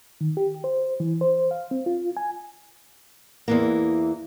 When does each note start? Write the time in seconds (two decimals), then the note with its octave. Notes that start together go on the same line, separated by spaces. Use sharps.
0.21 D#3
0.37 G4
0.64 C5
1.00 E3
1.21 C5
1.51 F5
1.71 C4
1.86 F4
2.17 G#5
3.48 E2 E3 A#3